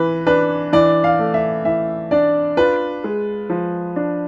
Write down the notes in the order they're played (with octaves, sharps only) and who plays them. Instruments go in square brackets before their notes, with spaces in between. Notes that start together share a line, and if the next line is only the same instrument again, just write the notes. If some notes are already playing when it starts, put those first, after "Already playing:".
Already playing: [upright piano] E3 [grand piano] B4
[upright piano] D4 [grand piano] B4
[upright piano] E3 [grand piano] D5
[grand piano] F5
[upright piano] A3
[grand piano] E5
[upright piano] E3 [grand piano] E5
[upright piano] D4 [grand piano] D5
[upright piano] F4 [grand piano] B4
[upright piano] G#3
F3
D4